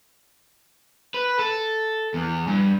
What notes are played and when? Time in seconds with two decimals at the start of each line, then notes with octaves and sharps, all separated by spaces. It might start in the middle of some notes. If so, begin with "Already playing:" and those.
1.14 B4
1.39 A4
2.14 E2
2.47 G2